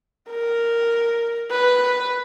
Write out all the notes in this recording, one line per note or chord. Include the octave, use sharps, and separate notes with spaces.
A#4
B4